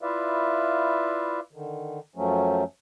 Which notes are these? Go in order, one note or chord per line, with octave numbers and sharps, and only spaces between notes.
E4 F4 B4 D5 E5 F5
D3 D#3
F#2 F3 F#3 A3 C#4